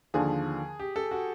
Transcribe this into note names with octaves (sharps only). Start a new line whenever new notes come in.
D#2 D3 F3 G#4
G4
A4
F#4